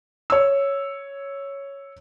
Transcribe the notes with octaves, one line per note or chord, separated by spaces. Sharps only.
C#5 E6